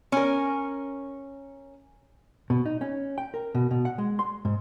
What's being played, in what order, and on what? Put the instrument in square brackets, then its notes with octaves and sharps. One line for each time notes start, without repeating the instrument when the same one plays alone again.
[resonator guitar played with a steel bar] C#4 A#4
[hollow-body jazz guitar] B2
D#4
C#4
G5
A#4
B2
B2
F#5
G#3
C6
G#2